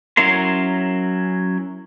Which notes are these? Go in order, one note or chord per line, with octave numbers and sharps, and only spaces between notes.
F#3 C#4 E4 A#4 C6